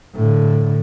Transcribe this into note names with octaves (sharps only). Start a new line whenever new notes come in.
A2 D3